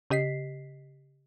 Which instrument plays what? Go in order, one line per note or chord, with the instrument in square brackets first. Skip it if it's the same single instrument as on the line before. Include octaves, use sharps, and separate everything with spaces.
[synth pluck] C#3 G4 D#5 B6 C7